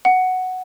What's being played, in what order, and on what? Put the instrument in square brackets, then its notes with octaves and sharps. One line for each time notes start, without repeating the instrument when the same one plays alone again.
[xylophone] F#5